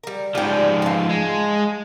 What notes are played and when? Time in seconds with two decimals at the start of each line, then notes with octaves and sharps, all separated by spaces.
0.03 G3 A#4
0.35 G#2 F3 G3 G5
0.82 F5 A5
1.09 G#3